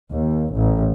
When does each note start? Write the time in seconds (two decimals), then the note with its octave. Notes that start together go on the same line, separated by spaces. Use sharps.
0.11 D#2
0.56 A1